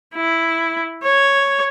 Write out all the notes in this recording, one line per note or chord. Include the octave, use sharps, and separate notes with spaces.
E4
C#5